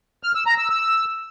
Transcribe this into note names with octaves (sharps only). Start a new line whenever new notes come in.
F6
E6
A#5
E6
E6